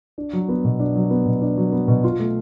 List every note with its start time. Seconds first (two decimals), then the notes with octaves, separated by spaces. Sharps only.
0.18 D4
0.33 F#3
0.49 B3
0.65 B2
0.80 D4
0.96 F#3
1.10 B3
1.26 B2
1.42 D4
1.58 F#3
1.72 B3
1.88 B2
2.04 F4
2.20 A3